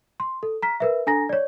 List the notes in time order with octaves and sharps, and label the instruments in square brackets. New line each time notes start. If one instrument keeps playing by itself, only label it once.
[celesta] C6
A4
A#5 F6 B6
A#4 B4 E5
D4 A4 G#5 A#5 A#6
C#5 D5